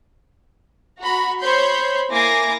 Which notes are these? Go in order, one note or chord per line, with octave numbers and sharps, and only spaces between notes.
F#4 A#5 B5
C5 C#5 B5 C6 G6
A#3 E4 G#5 D6 A#6 C7